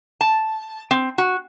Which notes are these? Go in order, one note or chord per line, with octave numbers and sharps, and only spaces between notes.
A5
C4
F#4